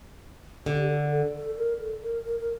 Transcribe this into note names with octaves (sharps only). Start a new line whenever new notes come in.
D3 G4
A4
A4
A4
A#4
A4
A#4
A#4
A#4